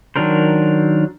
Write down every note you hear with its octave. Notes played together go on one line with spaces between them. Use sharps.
D#3 F#3 D4 A#4 C5